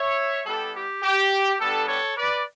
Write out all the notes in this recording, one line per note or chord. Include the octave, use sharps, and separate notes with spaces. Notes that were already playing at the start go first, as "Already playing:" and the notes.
Already playing: C#5 E5
G3 B3 E4 G4 A4
G4
G4
G3 B3 D4 G4 A4
A4 C#5
B4 D5